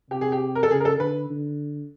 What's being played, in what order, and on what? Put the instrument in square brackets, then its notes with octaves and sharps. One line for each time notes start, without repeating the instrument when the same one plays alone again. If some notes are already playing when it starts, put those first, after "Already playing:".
[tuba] C3 [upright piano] G4
[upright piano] G#4
G4
A#4
A4
[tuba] C#3 [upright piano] G#4
[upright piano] A#4
A4
[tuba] D3 [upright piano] B4
[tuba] D3